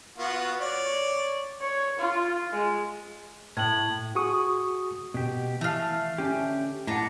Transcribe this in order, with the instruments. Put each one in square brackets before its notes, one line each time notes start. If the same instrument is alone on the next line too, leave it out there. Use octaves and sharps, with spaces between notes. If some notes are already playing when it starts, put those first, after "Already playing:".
[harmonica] B3 F4 F#4
C#5 D5
[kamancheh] C#5
F4
G#3
[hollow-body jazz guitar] A2 [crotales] G#6 F#7
[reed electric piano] F#4 G#4 C#6 D#6
[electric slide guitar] B2 G4
[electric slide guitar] E3 F5 [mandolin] A3 F6
[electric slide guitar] D3 C#4 G4
[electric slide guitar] A2 F#5 [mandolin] D4 A#5